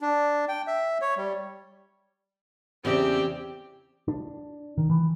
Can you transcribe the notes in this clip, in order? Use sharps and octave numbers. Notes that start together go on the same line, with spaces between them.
D4
G5
E5
C#5
G3
E2 C#3 C4 G4 D5
D4
D#3
E3